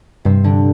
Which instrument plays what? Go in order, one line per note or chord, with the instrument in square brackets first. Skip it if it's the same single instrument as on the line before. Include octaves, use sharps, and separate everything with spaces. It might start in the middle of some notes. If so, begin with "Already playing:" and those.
[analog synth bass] G2 [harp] C3 C4
[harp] D3 D4